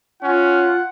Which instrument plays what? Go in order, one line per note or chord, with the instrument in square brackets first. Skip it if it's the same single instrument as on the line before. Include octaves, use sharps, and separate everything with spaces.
[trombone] C#4 [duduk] F4 [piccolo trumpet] F#5